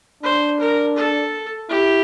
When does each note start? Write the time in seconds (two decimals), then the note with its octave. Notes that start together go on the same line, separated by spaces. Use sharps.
0.23 D4 C5
0.60 A#4
0.96 A4
1.69 E4 G4